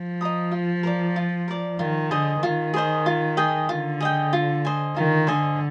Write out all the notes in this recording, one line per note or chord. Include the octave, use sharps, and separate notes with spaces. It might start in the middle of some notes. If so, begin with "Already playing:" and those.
Already playing: F3
D#5 A#5 D#6
F4
A#4 D5
F4
A#4 D5
D#3 F4
D3 G#4 C5 D#5
D#3 F4
G#4 C5 D#5
F4
G#4 D#5 G5
D3 F4
G#4 D#5 G5
F4
C5 D#5 G#5
D#3 F4
D3 C5 D#5 G#5